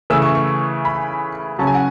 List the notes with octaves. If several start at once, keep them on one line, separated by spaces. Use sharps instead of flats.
C#3 E3 A3 E6
C#6
C#6
B5
C#3 F#3 C#4 A5
G#5
F#5